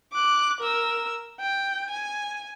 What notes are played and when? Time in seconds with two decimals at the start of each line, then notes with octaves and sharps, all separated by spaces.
0.13 D6 F#6
0.61 A#4 E6
1.40 G5
1.90 G#5